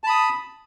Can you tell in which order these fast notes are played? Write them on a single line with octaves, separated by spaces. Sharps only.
A5 B5 D#6